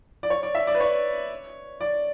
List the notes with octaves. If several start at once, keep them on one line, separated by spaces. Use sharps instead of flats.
D5
C#5
D5
E5
D5
B4
C#5
D5